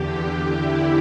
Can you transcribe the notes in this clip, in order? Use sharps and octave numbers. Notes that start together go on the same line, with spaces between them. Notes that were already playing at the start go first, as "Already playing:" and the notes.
Already playing: E2 D3 G4
E4